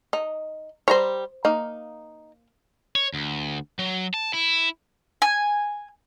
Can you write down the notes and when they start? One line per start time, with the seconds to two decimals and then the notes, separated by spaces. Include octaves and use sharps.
0.13 D#4
0.88 G3 C5 C#5 A#5
1.45 A#3 D#4
2.95 C#5
3.14 D2
3.79 F#3
4.14 A5
4.34 E4
5.22 G#5